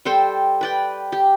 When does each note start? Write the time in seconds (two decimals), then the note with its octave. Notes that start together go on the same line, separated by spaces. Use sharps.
0.05 G3 A4 C5 G5
0.61 B4 D5 G5
1.12 G4